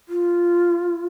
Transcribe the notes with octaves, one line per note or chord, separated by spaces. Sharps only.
F4